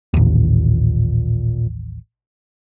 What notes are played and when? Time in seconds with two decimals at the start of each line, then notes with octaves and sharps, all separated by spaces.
0.14 A1 D#2 A#2